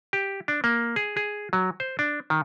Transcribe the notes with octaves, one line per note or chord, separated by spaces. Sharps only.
G4
D4
A#3
G#4
G#4
F#3
C5
D4
D#3